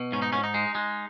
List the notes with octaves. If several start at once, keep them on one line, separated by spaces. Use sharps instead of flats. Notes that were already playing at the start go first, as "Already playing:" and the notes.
Already playing: B2
G#2 C#4
D#4
G#2 C#4
D#4
G#3
G#3